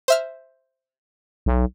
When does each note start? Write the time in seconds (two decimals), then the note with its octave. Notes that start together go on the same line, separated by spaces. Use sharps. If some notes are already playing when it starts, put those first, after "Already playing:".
0.08 C5 E5 F6
1.46 B1